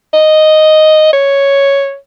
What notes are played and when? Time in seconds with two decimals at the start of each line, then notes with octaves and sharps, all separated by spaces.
0.14 D#5
1.13 C#5